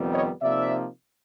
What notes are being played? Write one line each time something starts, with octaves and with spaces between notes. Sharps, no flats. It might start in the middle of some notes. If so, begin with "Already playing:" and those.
Already playing: F2 C3 D#3 G3 B3
C#5 D#5
C3 F3 A#3 D#4 D5 E5